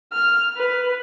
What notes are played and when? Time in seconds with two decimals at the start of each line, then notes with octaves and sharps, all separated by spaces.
0.12 F6
0.57 B4